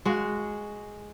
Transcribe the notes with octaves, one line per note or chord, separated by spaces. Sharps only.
G#3 F#4